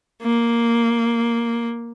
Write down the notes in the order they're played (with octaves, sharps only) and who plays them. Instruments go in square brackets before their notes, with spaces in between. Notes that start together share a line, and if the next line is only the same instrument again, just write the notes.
[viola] A#3